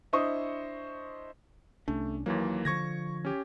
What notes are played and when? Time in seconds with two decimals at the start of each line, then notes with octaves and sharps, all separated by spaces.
0.13 D4 E4 C5 D#5 C#6 D#6
1.88 C2 A3 C#4 D4
2.26 D#2 E3 F#3 A#3
2.65 D3 F3 C#6 G#6 A#6
3.25 C#4 G4